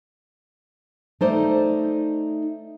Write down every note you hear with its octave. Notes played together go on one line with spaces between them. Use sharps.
A3 D#4 C5 D5